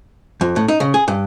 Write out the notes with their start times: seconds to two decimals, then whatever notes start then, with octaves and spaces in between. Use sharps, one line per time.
0.41 F2
0.56 A2
0.68 D#4
0.80 C#3
0.94 G#4
1.08 G2